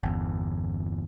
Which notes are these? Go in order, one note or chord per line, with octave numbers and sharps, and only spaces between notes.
G1 E2